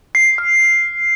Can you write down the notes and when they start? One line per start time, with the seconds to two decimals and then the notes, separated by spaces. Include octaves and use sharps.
0.15 C7
0.38 F6